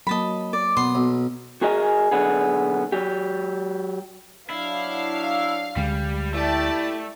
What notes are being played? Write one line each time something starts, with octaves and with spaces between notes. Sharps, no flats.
F#3 A#3 D#5 A5 B5
D5
B2 B3 C6
B1
F#4 G#4 A#4 D#5 F#5 G#5
B1 D3 B3 G#4
F#3 G4
F#3 D4 E4 F5
D2 D3 G3 G#3
A3 E4 G4 D5 A5